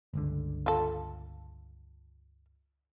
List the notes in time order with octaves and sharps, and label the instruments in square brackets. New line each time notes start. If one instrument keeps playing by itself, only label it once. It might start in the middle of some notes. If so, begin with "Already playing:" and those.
[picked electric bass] G1 C#2 D3
[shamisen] F4 A4